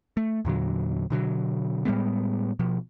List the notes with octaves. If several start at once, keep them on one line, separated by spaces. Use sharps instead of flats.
A3
E2 A#2 D3 F#3
B2 D3 F3 F#3
A2 G3 G#3 B3
B2 F3